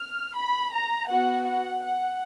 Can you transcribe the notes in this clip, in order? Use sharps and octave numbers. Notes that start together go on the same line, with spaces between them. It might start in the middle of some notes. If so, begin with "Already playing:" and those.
Already playing: F6
B5
A#5
B3 F#4 F#5
F#5
F#5